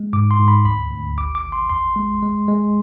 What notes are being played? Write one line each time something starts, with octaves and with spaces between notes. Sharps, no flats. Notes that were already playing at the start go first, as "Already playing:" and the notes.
Already playing: G#3
G#2 D6
C6
G#2
B5
D2 B5
D2
G#1 D6
D6
G#1
C6
E2 C6
G#3
G#3
G#3